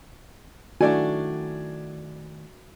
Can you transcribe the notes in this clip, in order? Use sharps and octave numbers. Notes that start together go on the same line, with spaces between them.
D#3 A3 D4 E4 F#4 D5 G#5